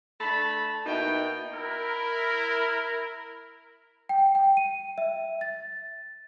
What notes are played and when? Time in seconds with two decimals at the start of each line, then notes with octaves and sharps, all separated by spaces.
0.20 A3 D4 A5 B5
0.86 B2 A#3 D#4 E4 G5
1.53 E4 A#4
4.09 G5
4.35 G5
4.57 D#7
4.98 E5
5.41 A6